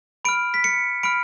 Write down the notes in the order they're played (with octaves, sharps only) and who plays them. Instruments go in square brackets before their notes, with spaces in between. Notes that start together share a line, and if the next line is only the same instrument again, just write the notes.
[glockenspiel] B5 F6 D7
B6
C#7
B5 F6 D7